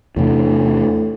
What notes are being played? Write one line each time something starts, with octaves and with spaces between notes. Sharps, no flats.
E2 A2 C3 D4